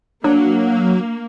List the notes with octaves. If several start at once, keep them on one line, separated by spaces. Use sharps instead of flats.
F#3 A#3 D4